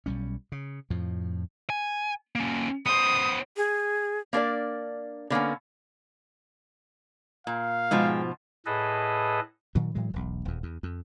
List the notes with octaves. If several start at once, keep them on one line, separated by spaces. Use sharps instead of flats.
B1 G3 C#4
C#3
F2 A2 F3
G#5
A#3 C#4
B3 C5 D#6
G#4
A#3 D4 A#4 D5
D3 A#3 B3 C#4
A#2 F5
G#2 B2 F3 G#3 G5
A2 G#4 A4 B4 D#5
A#2 D#3 F#3
A2 E3 F#3 G#3
E1 B1
D#1 E2
E2
F2